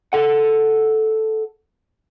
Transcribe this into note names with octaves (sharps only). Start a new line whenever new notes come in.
A4 F#5